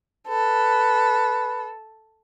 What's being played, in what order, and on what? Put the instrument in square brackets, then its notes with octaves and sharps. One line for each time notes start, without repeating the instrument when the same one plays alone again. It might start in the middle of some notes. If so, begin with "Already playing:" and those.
[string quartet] A4 [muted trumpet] B4